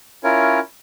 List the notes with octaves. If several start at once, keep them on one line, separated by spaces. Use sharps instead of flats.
C#4 E4 F4 A#4 C#5